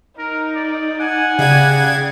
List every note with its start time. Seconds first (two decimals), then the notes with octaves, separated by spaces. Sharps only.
0.18 D#4 A#4
0.56 D5
1.00 F#5 G#5
1.39 C#3 G4 D5 G#6